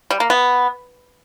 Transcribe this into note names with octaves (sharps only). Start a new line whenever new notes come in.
G3
A#3
B3